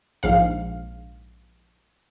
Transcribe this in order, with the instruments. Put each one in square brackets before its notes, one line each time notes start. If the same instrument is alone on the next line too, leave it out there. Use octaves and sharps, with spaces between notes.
[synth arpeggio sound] A#1 G#2 F5